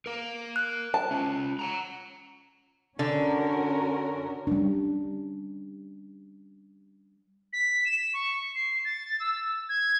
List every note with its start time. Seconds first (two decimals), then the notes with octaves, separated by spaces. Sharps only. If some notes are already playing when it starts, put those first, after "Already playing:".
0.06 A#4 F5
0.56 F#6
0.94 A5
1.11 C#4 F4
1.59 F#5 G5 A#5
2.99 D3 C#4 F#4 A#4
4.47 G3 C#4 D4
7.53 B6
7.85 E7
8.14 C#6
8.55 C7
8.85 A6
9.20 E6
9.69 G#6